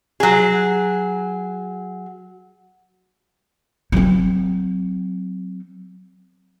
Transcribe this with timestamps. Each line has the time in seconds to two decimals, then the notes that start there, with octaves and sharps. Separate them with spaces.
0.20 F#3 G#4
3.92 F#3 C4